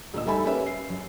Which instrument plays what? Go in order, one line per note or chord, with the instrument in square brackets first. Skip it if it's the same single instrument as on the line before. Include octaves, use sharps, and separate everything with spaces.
[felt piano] D2 A#2 D#5 E6
G3 D#4 A4 E5 G#5 B5
A#3 C#4 G4 B4 E5
C7
F#2